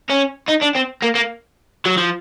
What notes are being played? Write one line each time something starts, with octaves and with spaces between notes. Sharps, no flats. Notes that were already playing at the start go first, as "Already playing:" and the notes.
C#4
D#4
D4
C4
A#3
A#3
F#3
F3